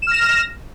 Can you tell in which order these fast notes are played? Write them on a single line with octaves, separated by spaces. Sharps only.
E7 F6 A#6